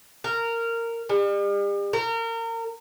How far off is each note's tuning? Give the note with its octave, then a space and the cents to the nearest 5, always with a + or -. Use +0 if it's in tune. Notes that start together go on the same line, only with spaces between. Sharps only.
A#4 -15
G3 +40
A#4 -30